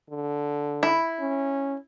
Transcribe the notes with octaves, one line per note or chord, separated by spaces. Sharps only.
D3
E4
C#4